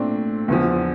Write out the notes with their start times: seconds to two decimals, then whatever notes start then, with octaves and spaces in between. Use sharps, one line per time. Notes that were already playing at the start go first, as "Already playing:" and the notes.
Already playing: A#2 A3 C4 D4
0.48 E2 D3 F3